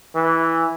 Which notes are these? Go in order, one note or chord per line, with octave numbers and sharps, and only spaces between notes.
E3